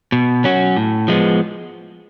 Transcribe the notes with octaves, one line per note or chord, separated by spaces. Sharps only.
B2
F#3 C#4 F#4
A2
F3 G#3 B3